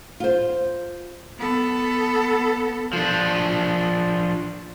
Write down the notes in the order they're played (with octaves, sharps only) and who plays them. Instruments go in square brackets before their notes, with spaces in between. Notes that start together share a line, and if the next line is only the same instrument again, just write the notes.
[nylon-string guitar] F4 C5
[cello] B3 A4
[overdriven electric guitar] F3 D4